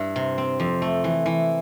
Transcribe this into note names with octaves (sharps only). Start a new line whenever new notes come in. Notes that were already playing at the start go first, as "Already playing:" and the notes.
Already playing: G2 E4
C3
C4
F2
A3
E3
E3